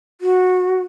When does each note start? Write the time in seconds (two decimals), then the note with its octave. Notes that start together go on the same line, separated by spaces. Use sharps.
0.21 F#4